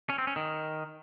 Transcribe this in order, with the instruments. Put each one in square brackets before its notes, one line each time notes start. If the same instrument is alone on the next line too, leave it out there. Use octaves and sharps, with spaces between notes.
[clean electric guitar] C#4
C4
C#4
D#3